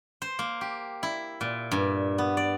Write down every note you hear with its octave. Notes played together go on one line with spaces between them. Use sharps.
C5
A#3
G4
E4
A#2
G2
B3
D5